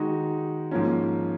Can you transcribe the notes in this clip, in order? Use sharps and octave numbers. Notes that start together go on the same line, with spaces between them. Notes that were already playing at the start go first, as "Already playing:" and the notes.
Already playing: D#3 G#3 D#4 F#4
G#2 F3 A#3 C#4